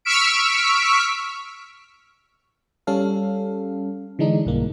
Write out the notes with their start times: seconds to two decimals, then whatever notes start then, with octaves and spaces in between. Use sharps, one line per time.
0.05 C#6 E6 F6 B6 D7
2.87 G3 C#4 A4 F5
4.19 D3 E3 G#3 D4 D#4
4.45 B1 G2 A#3